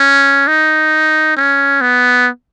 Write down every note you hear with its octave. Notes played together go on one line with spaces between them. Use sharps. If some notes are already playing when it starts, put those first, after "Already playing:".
Already playing: C#4
D#4
C#4
B3